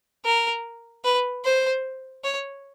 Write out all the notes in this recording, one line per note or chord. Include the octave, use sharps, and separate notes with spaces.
A#4
B4
C5
C#5